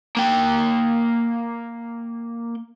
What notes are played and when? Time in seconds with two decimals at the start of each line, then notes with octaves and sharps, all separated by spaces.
0.17 A#3 G5